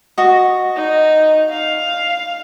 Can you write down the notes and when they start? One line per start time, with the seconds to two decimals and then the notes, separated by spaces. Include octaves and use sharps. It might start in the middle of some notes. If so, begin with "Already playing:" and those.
0.18 F#4 D#5
0.76 D#4
1.49 F5